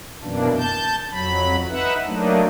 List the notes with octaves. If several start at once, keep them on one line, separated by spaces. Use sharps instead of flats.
F#2 B2 E3 A#3 D4
A5 G6
F2 F#3 B5
D#4 B4 E5 F#5
F#3 A3 A#3 D4 D#4